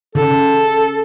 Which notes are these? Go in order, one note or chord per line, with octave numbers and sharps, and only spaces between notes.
C#3 A4